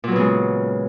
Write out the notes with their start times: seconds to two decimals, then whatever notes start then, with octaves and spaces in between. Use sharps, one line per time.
0.04 A#2
0.08 F#3
0.12 B3
0.16 C#3
0.20 G#3